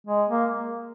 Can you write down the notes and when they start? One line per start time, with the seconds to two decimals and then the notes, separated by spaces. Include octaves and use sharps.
0.07 G#3
0.29 A#3